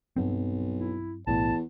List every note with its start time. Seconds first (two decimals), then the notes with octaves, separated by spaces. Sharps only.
0.16 B1 G2 F#3 C4
0.77 E4
1.27 B1 E2 A2 A5